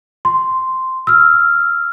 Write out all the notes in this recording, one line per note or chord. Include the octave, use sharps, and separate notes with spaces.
C6
E6 F6